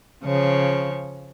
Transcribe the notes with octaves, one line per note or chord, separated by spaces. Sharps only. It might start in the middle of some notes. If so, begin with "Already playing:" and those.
C#3 F3 C#5